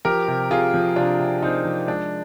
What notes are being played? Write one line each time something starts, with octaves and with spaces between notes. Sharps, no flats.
F3 G4 A#4
C3
C3 F4 G#4
F3
C3 D4 F4
C3
C3 C4 D#4
F3
G#3 D4